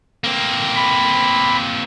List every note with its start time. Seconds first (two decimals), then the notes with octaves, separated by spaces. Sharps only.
0.24 A#3 C4
0.76 B5